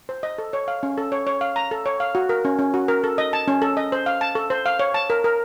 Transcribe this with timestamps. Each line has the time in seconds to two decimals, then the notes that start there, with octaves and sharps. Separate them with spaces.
0.09 C5
0.23 D#5
0.38 A4
0.53 C#5
0.68 F5
0.83 C#4
0.98 A4
1.12 C#5
1.27 C#5
1.41 F5
1.56 A#5
1.71 A4
1.86 C#5
2.00 F5
2.15 F#4
2.29 A#4
2.45 C#4
2.59 C#4
2.74 F#4
2.88 A#4
3.04 A4
3.18 D#5
3.33 A5
3.48 C#4
3.62 A4
3.77 D#5
3.92 C5
4.06 F5
4.21 A5
4.35 A4
4.50 C5
4.66 F5
4.79 C#5
4.94 A5
5.10 A#4
5.24 A#4